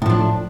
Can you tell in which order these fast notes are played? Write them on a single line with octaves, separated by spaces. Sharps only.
A2 F3 D4